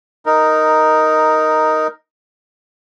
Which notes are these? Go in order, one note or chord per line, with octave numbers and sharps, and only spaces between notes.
D#4 A#4